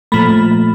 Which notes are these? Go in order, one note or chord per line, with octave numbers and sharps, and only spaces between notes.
A#2 F3 A3 B5